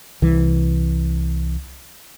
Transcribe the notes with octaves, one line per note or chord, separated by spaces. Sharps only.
C2 E3